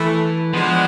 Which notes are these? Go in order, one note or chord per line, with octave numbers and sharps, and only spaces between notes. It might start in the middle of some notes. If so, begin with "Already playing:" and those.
Already playing: E3 A3 E4 A4
F3 G#3 B3 D4